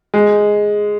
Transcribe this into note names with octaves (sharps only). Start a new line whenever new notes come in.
G#3